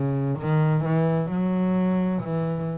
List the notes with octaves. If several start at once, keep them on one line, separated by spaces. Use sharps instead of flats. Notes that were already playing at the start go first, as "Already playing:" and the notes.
Already playing: C#3
D#3
E3
F#3
E3